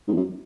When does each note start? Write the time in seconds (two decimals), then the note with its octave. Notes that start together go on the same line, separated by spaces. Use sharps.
0.08 G#2
0.12 E2
0.16 F#2